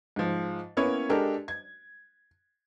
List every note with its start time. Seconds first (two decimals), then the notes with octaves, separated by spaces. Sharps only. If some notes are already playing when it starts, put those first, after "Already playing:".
0.16 G#2 F3
0.77 A#3 B3 C#4 E4 C#5
1.09 G#3 D4 G4 A4 A#4
1.48 G#6